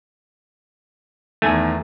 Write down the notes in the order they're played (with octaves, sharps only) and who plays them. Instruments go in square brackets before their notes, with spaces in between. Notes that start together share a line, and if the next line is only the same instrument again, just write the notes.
[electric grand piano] E2 D#3 [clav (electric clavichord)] A3 G#5